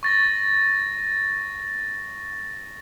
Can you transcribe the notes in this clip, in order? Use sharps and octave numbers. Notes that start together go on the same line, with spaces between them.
C#6 A6 A#6